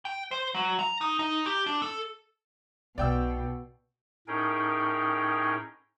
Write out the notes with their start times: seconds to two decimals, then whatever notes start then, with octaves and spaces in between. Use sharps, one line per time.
0.05 G5
0.31 C5
0.54 F#3
0.79 A#5
1.01 D#4
1.19 D#4
1.46 G4
1.66 D4
1.82 A4
2.98 B1 B2 D#4 D5 G5 E6
4.28 A2 C#4 D#4 G#4 A#4 G5